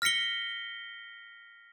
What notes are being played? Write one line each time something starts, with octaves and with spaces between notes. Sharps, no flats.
F6 A#6 B6 C#7 G7